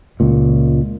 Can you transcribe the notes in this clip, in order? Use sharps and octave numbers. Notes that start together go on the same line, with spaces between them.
C#2 A#2